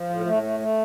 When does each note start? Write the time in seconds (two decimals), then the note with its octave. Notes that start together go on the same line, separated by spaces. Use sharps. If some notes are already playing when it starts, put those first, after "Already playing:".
Already playing: F3
0.09 A2
0.26 A2 A3
0.43 A3
0.60 A3